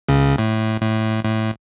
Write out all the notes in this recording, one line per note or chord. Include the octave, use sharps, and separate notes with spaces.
C#2 C#3
A2
A2
A2